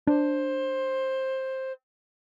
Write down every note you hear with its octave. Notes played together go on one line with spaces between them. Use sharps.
D4 C5